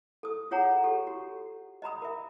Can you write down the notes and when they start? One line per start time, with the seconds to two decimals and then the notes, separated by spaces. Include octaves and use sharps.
0.23 A4 D#6
0.51 F4 G#4 C#5 F#5 A#5
0.84 G4 A4
1.07 F#4
1.82 D#5 A#5 B5 D#6
2.02 A#4 E5